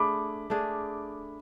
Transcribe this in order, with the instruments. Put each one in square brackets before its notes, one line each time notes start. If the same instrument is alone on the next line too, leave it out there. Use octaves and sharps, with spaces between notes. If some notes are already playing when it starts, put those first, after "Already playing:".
Already playing: [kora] A3 D4 G#4 [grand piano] B5 D6
[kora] A3 D4 G#4